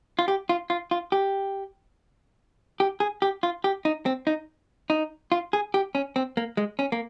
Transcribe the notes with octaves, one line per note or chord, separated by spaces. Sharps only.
F4
G4
F4
F4
F4
G4
G4
G#4
G4
F4
G4
D#4
C4
D#4
D#4
F4
G#4
G4
C#4
C4
A#3
G#3
C#4
A#3